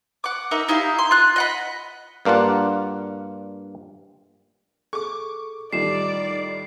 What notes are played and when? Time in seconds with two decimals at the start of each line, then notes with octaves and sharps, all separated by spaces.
0.24 F#5 D6
0.51 D#4 A#4 E5
0.68 D#4 E4 G4 F5
0.99 C6
1.11 F4 F#6
1.36 D#5 F#5 B5
2.25 G2 A#3 D4 F4 F#5
4.93 G#4 A4 C#6 D6
5.73 A2 D#3 G3 D#4 F4 D5 C7 E7